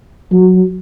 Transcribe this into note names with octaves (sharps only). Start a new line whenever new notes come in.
F#3